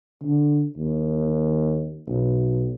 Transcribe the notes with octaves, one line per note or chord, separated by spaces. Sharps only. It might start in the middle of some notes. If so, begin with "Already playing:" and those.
D3
D#2
B1